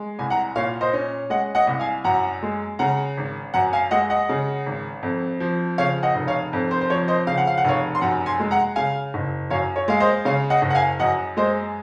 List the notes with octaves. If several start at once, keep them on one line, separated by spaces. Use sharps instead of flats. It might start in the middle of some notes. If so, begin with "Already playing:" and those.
Already playing: G#3
C2 G#5
F#5 A#5
A#2 C#5 F5
C5 D#5
C#4
G#3 D#5 F#5
D#5 F#5
C2
F5 G#5
F#2 F#5 A#5
G#3
C#3 F#5 A#5
G#1
F#2 F#5 A#5
F5 G#5
G#3 D#5 F#5
D#5 F#5
C#3
G#1
F2
F3
C#3 C#5 F5
D#5 F#5
F1
C#5 F5
F2
C5
C5
F3 C#5
C5 D#5
C#3 F5
F#5
F5
F#5
F1 C#5 F5
C6
F#2 F#5 A#5
G#5 C6
G#3
F#5 A#5
C#3 F5 G#5
F#1
F#2 C#5 F5
C#5
G#3 F5
C5 D#5
C#3 C#5 F5
D#5 F#5
F#1
F#5
F5 G#5
F#2 D#5 F#5
G#3 C5 D#5